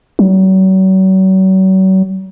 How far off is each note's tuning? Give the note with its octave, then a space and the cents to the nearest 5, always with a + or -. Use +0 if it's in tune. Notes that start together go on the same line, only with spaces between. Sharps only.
F#3 +40